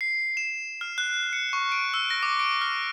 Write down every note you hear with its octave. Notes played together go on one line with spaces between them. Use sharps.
C7
E7
F6
F#6
C#7
C#6
D7
E6
A#6
D6
D7
F6